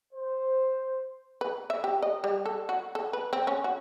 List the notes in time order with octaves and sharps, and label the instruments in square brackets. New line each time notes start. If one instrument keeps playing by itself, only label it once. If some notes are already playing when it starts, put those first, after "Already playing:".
[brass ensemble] C5
[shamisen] B4
E5
G4
D#5
G3
A4
F#4
A4
B4
C4
C#4
F#4